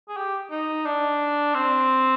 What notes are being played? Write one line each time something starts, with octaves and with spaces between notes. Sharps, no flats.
G#4
G4
D#4
D4
C4